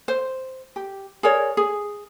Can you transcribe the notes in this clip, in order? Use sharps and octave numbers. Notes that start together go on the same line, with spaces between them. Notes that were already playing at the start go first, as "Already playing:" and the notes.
C5
G4
G#4 A#4 C#5 D5
G#4